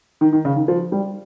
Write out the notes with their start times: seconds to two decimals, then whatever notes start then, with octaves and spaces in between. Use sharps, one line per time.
0.21 D#3
0.33 D#3
0.45 C#3
0.56 D#3
0.68 F3
0.92 G3